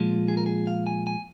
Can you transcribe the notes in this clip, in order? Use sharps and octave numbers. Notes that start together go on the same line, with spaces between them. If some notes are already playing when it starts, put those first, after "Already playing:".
Already playing: A#2 F3 G#3 F4
G#4
A#4
G#4
F5
G#5
G#5